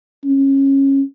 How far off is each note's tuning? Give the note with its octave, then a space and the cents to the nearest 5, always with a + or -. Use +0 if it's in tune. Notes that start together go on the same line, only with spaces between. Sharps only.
C#4 -20